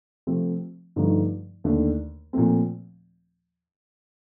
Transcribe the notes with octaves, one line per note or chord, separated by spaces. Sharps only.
C3 F3 A3 C4
G2 D3 F3 A3 D#4
D#2 D3 A3 D4
A#2 F3 A3 C4